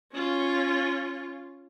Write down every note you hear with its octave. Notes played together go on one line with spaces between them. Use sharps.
C#4 F4